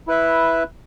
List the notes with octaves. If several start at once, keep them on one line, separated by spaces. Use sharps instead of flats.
E4 B4 E5